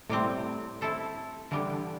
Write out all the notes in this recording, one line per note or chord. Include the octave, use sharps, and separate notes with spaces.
A2 C3 G3 C4
A3 E4 A4 C5
D3 E3 G3 B3